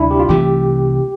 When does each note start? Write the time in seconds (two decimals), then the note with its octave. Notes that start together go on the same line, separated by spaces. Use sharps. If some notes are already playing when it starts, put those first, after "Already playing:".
Already playing: D2 C3 G3 D4 E4
0.11 G4
0.20 F4
0.29 C2 C3 E3 A3 G4